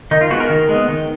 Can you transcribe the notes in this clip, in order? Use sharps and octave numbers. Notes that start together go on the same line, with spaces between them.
D#3 D#4
F4
G#3 B3 F#4
A#4
D#3
G#3 B3
D#3